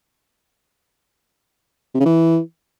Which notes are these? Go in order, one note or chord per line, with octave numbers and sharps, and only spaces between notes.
C3
C#3
E3